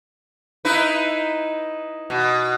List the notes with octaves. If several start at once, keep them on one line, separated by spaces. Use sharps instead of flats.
D#4 E4 B4
B2